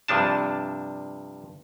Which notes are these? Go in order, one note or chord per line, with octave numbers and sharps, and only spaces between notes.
G2 C3 F3 D4 A5